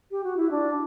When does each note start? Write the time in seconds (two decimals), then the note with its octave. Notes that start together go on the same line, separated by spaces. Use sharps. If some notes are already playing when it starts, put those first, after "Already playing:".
0.11 G4
0.23 F#4
0.36 E4
0.51 D4